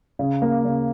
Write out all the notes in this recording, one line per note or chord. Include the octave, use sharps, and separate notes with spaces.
C#3
A#3
C#3